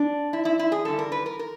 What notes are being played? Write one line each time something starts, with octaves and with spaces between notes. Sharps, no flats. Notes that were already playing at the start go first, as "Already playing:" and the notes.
Already playing: D4
E4
E4
E4
G#4
G2 D3 G3 A4
A#4
B4
A#4
A#4